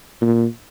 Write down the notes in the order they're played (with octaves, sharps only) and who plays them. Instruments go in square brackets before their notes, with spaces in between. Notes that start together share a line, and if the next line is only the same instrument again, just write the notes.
[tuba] A#2